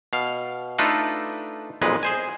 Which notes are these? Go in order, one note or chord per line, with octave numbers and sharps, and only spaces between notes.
B2 F5
A3 D4 D#4 F4 A4 B4
B1 F2 A#2 G#3 B4
G#4 C5 G#5